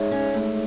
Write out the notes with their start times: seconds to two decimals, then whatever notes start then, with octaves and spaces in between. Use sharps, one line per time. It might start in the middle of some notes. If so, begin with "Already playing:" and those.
Already playing: G#3 D#4 G#4 C#5 E5
0.11 C#4
0.34 A3